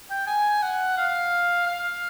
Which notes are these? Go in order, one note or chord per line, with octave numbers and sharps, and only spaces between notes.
G5
G#5
F#5
F5
F5